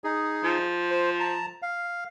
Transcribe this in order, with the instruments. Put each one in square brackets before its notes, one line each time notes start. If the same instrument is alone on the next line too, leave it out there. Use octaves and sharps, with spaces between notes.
[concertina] D#4 G#4
[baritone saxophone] F3
[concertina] C5
A5 A#5
F5